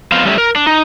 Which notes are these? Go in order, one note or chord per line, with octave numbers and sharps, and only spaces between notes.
F2 B3 C5 F5
G3 A3 C#4 G4 D#5 E5
A#4
D4
D#4